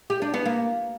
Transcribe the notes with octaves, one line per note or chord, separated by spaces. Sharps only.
G4
D4
B3
A#3